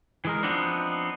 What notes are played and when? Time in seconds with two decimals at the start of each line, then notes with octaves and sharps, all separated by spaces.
0.25 E3 G#3 A#4
0.43 F3 B3 C4 D4 D#4